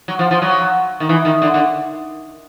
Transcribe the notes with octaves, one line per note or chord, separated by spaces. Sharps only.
F#3
F3
F3
F#3
D#3
E3
D#3
D3
D3